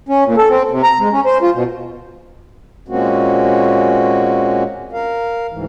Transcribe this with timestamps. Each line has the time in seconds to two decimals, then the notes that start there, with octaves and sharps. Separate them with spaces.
0.09 C#4
0.25 A#2
0.38 A4
0.49 C4
0.71 C3
0.84 A#5
0.99 G#3
1.12 C#4
1.26 C5
1.42 F4
1.55 B2
2.89 A#2 G#3 A#3 C4 C#4 F#4
4.93 A#4 F5
5.50 D2 G#2 E3